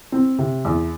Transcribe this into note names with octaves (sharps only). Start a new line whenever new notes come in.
C4
C3
E2